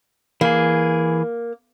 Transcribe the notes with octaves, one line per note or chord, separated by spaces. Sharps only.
E3 A#3 G#4